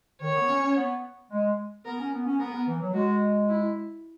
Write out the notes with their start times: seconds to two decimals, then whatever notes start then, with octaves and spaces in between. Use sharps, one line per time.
0.21 D#3 C#5
0.35 B3
0.49 C#4
0.63 C#4
0.76 B3
1.31 G#3
1.85 B3 A#4
1.99 C#4
2.12 B3
2.26 C#4
2.39 B3 A#4
2.53 B3
2.66 E3
2.80 F#3
2.94 G#3 F#4
3.48 E4